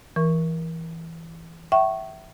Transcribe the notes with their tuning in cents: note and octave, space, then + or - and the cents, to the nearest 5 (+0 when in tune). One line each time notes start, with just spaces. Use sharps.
E3 +0 A#4 +25 C#6 +0
E5 +0 G5 -45 C#6 -10